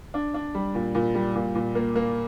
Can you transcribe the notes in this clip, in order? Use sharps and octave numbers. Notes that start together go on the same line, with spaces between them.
D4
D4
G3
A#2
A#2
G3
A#2
A#2
A#3
A#3